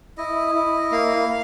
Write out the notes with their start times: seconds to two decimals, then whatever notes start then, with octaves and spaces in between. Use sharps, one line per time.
0.18 E4 D#5
0.55 E4
0.91 A#3 F5